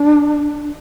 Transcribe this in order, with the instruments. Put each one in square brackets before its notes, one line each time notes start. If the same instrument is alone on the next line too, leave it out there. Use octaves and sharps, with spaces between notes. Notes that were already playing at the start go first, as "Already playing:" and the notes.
Already playing: [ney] D4